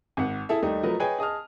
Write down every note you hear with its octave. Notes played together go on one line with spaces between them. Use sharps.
G#1 F#5
E4 G#4 A4 E5
D#2 G3 A3 D#4
F3 F#3 A3 A#4 B4 D#5
G#4 B4 C#5 D#5 G5 G#5
G#4 D#5 A5 D#6 F6